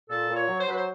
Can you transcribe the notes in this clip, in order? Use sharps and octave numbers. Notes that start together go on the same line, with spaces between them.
A#2 A4
A#2
C#5
F#3
C5
F#3 B4
C5